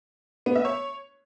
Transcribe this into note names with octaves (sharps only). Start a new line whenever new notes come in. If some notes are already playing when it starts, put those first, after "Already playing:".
B3
E5
C#5